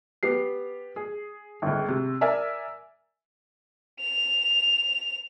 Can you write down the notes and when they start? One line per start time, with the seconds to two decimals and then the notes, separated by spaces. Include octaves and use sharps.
0.23 B3 G4 C7
0.96 G#4
1.62 G1 C#2
1.88 C3
2.21 A#4 D5 E5 G#5
4.01 F7